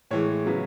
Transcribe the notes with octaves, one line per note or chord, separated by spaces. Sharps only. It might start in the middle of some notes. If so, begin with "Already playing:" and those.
A2 E3 G#3 C#5
C#3 F#3 B3